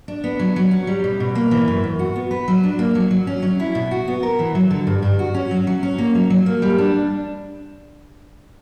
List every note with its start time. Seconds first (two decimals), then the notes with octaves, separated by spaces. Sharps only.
0.08 D4
0.24 B3
0.39 F#3
0.56 F#3
0.71 C#4
0.87 G3
1.04 B2
1.20 B2
1.35 A#3
1.51 E3
1.68 F#2
1.84 F#2
1.99 F#4
2.16 B3
2.31 B4
2.48 F#3
2.63 D4
2.79 A#3
2.95 F#3
3.11 F#3
3.27 C#4
3.43 F#3
3.60 E4
3.75 B2
3.91 F#4
4.08 B3
4.23 A#4
4.39 E3
4.55 F#3
4.71 D3
4.87 G2
5.02 G2
5.19 F#4
5.34 C#4
5.51 F#3
5.67 F#3
5.83 C#4
5.98 A#3
6.15 F#3
6.30 F#3
6.46 A#3
6.62 G3
6.79 D4